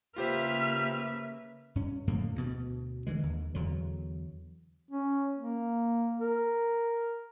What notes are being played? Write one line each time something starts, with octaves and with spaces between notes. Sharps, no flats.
C#3 A#3 F4 G4 B4 C5 E5 F6
G2 C#4
F2 A2 D3 A#3
D2 B2
D3 E3 G#3
D#2
E2 D3 F#3
C#4
A#3
A#4